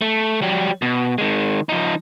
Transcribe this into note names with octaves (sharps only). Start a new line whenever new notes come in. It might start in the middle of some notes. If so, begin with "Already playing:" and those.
A3
F#3 G3
B2
D#3 G#3
F3 D#4